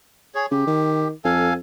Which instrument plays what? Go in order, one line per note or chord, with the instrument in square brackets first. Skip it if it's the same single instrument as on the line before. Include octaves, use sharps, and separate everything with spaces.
[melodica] G#4 C#5
[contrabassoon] C#3 [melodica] G4
[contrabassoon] D#3
[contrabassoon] F2 [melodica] A4 F5 G#5